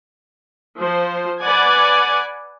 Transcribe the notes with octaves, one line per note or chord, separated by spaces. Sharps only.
F3 C5
B4 D5 F#5 G#5